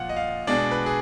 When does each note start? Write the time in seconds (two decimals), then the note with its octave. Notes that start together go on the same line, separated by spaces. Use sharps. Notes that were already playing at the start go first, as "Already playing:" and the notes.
Already playing: A#2 F3 A#3 F5 F#5
0.09 D#5
0.16 F5
0.47 B2 G#3 D4 D5
0.71 B4
0.86 G#4